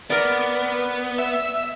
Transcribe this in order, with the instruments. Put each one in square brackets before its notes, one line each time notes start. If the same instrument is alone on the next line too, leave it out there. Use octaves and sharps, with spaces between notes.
[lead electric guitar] B3 [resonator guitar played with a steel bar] A#4 D5
[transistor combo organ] E5